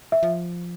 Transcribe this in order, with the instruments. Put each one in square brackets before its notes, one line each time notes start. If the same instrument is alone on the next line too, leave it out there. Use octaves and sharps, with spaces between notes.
[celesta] E5
[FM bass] F3